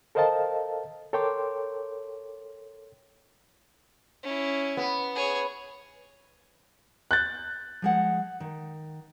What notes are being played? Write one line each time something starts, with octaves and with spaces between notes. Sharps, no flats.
A4 A#4 C5 D#5 F5 A5
A4 A#4 C#5 G5 C6 D6
C#4 E4
B3
G#4 C#5
F#6 G6 A6
F3 G#3 F#5
D#3